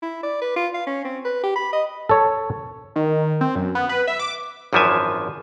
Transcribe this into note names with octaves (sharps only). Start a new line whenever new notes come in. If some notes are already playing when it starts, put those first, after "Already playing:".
E4
D5
B4
F4
F5
C#4
C4
B4
G4
B5
D#5
A4 C#5
D#3
C4
F#2
B3
B4
E5
D6
G#1 F#2 E3 F3 E5 G#5